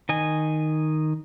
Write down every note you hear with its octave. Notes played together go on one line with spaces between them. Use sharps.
D#3 D#5 G#5